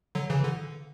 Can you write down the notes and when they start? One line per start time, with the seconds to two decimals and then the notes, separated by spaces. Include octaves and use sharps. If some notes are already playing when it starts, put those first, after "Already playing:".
0.15 D3 F#3
0.30 C#3 E3
0.44 D3